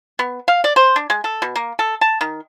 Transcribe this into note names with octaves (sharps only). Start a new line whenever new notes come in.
B3
F5
D5
C5
D4
G#3
A4
B2
A#3
A4
A5
D#3